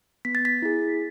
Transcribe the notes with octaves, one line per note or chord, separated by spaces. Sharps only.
B3 B6
A6
B6
E4 G#4